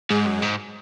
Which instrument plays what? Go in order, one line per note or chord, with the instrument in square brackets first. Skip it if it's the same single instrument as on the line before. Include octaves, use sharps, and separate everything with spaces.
[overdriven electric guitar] G#2 [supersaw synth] G#3
[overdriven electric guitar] F#2
G#2